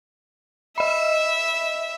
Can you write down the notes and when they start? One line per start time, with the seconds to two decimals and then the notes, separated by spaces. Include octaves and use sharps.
0.78 D#5 E5 B5